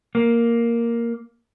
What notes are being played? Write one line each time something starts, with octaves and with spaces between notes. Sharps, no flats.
A#3